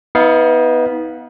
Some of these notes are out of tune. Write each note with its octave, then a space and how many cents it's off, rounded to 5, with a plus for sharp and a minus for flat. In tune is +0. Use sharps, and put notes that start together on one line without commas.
B3 +0 D#4 +45 F5 +0